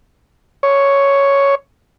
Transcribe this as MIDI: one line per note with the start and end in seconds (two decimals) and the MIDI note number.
0.63 1.55 73